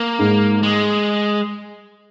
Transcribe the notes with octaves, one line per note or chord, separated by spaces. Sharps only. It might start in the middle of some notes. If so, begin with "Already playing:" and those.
Already playing: A#3
G#2
G#3